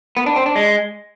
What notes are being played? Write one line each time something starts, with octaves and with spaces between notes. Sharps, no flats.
B3
D4
C4
D4
G#3